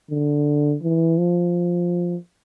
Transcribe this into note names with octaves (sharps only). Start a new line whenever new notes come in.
D3
E3
F3